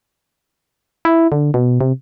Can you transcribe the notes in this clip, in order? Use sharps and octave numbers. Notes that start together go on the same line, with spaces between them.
E4
D3
B2
C3